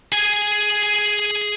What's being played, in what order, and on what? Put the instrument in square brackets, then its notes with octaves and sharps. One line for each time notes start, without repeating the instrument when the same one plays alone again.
[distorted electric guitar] G#4 G#5